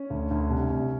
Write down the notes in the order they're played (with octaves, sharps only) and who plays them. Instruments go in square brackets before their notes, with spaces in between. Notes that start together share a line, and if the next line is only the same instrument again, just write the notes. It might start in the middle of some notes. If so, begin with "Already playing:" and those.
Already playing: [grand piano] C#4
D2
D2
C2
C2